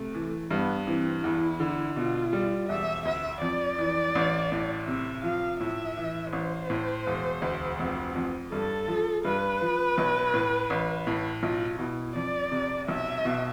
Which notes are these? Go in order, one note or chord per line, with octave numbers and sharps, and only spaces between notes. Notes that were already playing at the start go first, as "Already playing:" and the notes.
Already playing: C3 A3
E3
G2 B3
E3 C4
E2 E4
D3
B2 F4
G3
E1 E5
D2 E5
F2 D5
E3
A1
A2
C3 E5
F3 F5
A2 E5
E3
A1 C5
A2
E1
D2
F1
F2
G2 A4
F3
G2 B4
F3
B1
A2
A1
A2
B1 F4
B2 E4
F2 D5
C3
B1 E5
B2